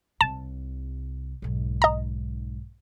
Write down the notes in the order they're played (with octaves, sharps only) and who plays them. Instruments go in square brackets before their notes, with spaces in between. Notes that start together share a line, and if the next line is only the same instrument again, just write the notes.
[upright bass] C2 C3 [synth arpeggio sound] A5
[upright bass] B1 G#2
[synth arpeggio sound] D#5 A#5